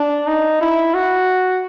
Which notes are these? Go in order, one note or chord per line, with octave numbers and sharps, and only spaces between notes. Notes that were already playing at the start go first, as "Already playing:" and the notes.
Already playing: D4
D#4
E4
F#4